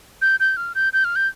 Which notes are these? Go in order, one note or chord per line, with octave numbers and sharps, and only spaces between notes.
G6
G6
F6
G6
G6
F6
G6